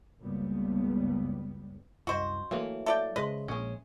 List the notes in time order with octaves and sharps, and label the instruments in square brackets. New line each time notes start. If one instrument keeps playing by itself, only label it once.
[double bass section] F#1 C#2 G3 B3
[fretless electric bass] C2 F#2 [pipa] F#4 C5 [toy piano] D#5 F5 F#5
[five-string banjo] E3 A#3 B4 [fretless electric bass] F#3 A3
[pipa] A4 D5 G5 [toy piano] E5
[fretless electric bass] C#3 G#3 [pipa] B4 [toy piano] C5 C6 [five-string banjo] D#5
[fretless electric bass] A#1 [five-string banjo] G#3 C#4